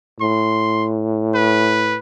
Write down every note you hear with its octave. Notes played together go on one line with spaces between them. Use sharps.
A2 C6
B4